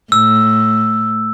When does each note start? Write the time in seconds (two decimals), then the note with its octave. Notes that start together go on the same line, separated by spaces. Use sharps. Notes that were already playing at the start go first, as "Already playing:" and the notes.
0.12 A2 E6